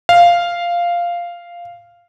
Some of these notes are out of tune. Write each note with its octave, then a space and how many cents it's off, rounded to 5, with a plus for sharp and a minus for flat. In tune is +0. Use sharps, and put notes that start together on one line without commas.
F5 -5